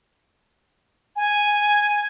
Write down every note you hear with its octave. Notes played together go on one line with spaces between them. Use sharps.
G#5